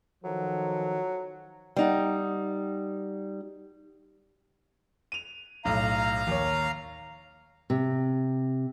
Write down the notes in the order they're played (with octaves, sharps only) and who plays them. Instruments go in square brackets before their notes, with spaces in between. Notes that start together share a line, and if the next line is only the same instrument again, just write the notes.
[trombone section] D#3 F3 A4 [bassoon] F#3
[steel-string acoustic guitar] G3 D#4 F#5
[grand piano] D#7 F7
[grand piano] B1 A2 [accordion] F5 A#5
[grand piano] D#2 C#5
[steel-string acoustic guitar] C3